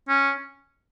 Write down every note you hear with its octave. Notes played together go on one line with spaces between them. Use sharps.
C#4